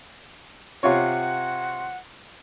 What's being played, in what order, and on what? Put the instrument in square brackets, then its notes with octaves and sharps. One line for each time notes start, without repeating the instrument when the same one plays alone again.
[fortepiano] C3 F4 C#5 [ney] F#5